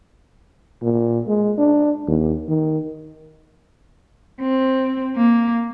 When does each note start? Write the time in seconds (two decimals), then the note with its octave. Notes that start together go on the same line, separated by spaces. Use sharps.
0.82 A#2
1.28 G#3
1.58 D4
2.07 D#2
2.48 D#3
4.41 C4
5.16 A#3